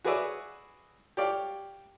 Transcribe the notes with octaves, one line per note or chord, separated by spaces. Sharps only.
F#4 G#4 B4 C#5 D5 E5
G4 C#5 D5 F5